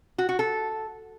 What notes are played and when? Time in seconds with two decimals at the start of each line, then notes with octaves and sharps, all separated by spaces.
0.18 F#4
0.29 F#4
0.39 A4